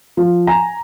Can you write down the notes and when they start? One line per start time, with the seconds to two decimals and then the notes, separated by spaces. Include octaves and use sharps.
0.17 F3
0.47 G#5 A#5